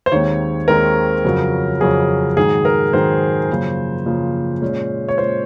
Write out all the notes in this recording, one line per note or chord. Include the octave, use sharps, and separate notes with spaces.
C5
D#2 D#3 G#3 C4 C#5
D#2 D#3 G#3 C4 A#4
F2 C#3 F#3 C#4
F2 C#3 F#3 C#4 G#4
G#2 D#3 F#3 G#4
A#4
G#2 D#3 F#3 C5
F#2 C#3 F3 A#3
F#2 C#3 F3 A#3
A#2 G#3 C#4
C#5
A#2 G#3 C#4 C5